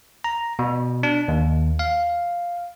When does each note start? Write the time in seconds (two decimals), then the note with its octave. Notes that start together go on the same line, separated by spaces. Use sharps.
0.24 A#5
0.59 B2
1.03 D4
1.28 D#2
1.79 F5